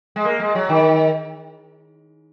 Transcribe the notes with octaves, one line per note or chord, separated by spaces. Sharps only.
G#3
A#3
G#3
F#3
D#3